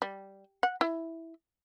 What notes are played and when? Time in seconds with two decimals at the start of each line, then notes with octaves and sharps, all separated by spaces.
0.02 G3
0.63 F#5
0.81 E4